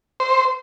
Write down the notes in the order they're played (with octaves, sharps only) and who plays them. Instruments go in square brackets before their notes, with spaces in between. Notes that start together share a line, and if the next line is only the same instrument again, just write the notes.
[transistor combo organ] C5